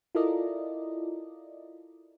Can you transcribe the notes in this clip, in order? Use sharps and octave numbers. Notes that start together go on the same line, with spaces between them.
E4 F4 A4 A#4 D5 D#5